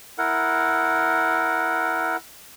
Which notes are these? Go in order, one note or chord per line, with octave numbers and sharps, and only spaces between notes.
E4 A#4 F#5